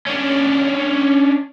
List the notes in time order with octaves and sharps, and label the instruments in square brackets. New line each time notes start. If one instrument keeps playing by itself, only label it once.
[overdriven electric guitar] C#4 D4